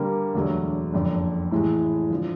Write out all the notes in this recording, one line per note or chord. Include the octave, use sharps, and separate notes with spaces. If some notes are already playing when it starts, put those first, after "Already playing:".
Already playing: D3 G3 A#3
E1 D2 D3 F#3
F#1 F2 D3
A2 E3 G#3
D3 F3